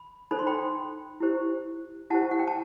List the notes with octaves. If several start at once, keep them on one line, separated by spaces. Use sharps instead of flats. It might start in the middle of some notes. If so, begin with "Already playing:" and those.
Already playing: B5
D#4 A4 C5 B5
C6
G5 B5
E4 G4 C5
E4 G4 C5 F#5 A5
F#5
G5
A5